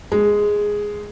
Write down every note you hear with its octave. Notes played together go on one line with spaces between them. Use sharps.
G#3